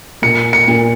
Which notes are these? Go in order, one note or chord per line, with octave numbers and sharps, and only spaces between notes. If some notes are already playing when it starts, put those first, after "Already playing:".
A#2 C#7
C#7
A#2